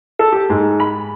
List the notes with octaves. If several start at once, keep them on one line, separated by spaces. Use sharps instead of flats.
A4
G4
G#2
B5